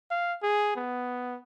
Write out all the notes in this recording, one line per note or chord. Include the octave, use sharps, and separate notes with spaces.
F5
G#4
B3